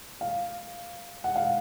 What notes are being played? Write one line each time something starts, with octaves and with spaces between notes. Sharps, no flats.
F5
F#5
F5